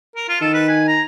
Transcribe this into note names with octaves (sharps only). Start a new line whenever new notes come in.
A#4
F4
D#3 A4
B4
G#5
A#5